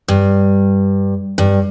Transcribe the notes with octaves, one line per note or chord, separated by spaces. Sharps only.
G2
G2